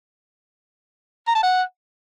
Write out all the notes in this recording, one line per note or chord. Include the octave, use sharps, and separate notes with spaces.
A#5
A5
F#5